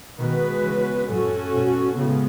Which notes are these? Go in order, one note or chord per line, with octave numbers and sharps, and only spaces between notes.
B2 D#3 G#3 B3 F#4 B4
C#3 E3
F#2 A2 C#4 F#4 A4
G#2 B2
A2 C#3 G#3 B3